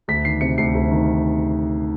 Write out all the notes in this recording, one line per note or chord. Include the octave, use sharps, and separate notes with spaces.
D2 B6
D#3 C7
C3 C#7
D2 C7
D2
D#3